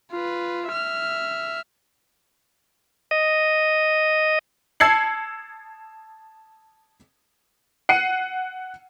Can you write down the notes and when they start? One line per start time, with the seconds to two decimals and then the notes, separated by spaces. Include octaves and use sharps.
0.11 F4 B4
0.68 E5 F6
3.11 D#5
4.80 A5 E6 G#6 C7 C#7 F#7
7.89 F#5 C7 C#7 D#7